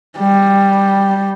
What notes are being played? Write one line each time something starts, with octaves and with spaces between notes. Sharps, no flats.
G3